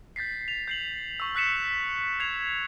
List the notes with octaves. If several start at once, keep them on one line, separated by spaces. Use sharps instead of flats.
G6 A6 B6 C7
F7
G6 C7 F#7
C#6 E6
E6 F#6 B6 C#7 E7
G#6 C7 F7